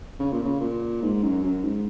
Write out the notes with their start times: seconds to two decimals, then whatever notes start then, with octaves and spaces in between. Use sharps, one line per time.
0.19 C#3
0.31 A#2
0.43 C#3
0.60 A#2
1.02 G#2
1.24 F#2
1.44 F#2
1.64 G#2